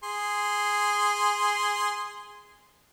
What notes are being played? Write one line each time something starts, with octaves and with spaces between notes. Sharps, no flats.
G#4 C6